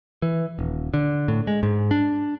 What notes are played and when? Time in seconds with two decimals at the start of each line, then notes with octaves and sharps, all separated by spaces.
0.22 E3
0.59 D#1
0.94 D3
1.28 A2
1.47 G#3
1.63 G#2
1.91 D4